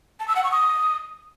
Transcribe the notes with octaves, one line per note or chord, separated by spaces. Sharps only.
A5
E6
F#5
C#6
D#6